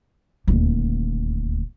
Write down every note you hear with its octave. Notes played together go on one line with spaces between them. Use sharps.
D#1 D2